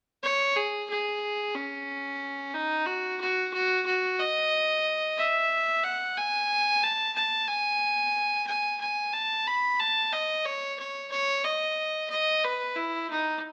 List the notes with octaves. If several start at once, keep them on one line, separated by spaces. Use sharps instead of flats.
C#5
G#4
G#4
C#4
D#4
F#4
F#4
F#4
F#4
D#5
E5
F#5
G#5
A5
A5
G#5
G#5
G#5
A5
B5
A5
D#5
C#5
C#5
C#5
D#5
D#5
B4
E4
D#4